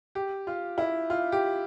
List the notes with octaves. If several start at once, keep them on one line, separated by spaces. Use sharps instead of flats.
G4
F4
E4
F4
G4